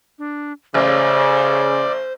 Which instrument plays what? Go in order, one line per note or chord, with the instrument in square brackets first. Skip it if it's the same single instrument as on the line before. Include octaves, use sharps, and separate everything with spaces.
[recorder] D4
[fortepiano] A1 [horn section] C#3 [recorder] C5 [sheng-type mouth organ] D5